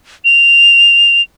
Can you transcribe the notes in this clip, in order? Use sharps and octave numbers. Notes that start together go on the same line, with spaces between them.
F7